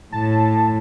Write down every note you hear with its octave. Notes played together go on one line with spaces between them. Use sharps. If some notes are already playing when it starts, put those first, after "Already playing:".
A2 A5